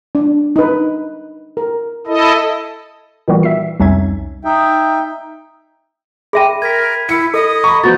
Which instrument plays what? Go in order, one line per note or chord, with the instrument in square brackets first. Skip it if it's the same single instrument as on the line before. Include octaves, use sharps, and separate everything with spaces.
[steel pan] D4
D#4 B4
A#4
[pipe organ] E4 A4 D#5
[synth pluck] A#2 D#3 E3 G3 B3 F#4
E5 C7
C2 F2 C#4 D#4 E5 G#6
[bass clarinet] D#4 [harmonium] E5 G5
[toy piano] G#4 E5 G5 [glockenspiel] B5 C6 D#7
[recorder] A#4 [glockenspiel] G#6 B6
[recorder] E4 [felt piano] C#7
[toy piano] A4 [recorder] D#5
[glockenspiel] A#5 [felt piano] B5 C#6
[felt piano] F3 B3 F#4 [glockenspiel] G6 A6